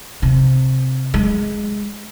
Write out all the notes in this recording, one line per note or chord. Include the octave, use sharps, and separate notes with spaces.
C3
G#3